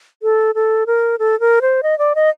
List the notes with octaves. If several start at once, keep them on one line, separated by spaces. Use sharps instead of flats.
A4
A4
A#4
A4
A#4
C5
D#5
D5
D#5